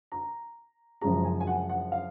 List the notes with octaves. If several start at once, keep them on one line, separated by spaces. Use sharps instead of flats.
A#5
F#1 F#2 F3 G#3 A#5
G#5
G#5
F#5
F#5
F5